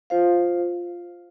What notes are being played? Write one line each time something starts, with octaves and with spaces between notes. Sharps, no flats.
F4 C5 F5